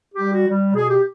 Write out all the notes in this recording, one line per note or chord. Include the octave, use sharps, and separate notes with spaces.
G4
G3
F#4
G3
B2 G#4
G4